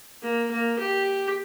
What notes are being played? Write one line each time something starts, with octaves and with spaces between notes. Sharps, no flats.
A#3
A#3
G4